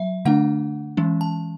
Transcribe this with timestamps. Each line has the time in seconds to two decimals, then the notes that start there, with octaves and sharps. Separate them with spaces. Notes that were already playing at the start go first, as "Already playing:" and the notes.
Already playing: F#3 E5
0.25 D3 A3 D4 F#5
0.97 E3 G#3 C#4
1.21 A5